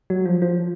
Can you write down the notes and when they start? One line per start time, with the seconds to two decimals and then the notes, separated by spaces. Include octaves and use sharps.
0.10 F#3
0.26 F3
0.42 F3